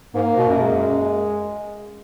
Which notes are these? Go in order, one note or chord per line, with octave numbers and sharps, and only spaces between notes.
G#2 A#3
B2
F#2
G#3